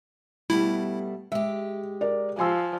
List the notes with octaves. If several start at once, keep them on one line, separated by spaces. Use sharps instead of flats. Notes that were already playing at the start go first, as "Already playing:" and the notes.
B2 G3 A3 E4
G#3 G4 E5
A#4 D5
F3 G#5 C6 E6